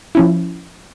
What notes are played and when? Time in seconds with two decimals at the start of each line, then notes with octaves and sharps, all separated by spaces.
0.15 F3 C#4 E4